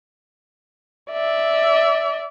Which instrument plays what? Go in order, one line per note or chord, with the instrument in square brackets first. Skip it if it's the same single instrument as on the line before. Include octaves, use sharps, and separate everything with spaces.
[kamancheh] D5 E5